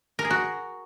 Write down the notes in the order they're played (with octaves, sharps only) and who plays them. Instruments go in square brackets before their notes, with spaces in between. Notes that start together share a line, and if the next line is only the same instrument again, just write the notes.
[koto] A#4
G#4
F#4